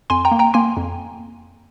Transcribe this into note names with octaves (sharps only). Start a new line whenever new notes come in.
F2 G#5 C6
G5 A#5
A#3
G5 A#5
A#3 G#5 C6
F2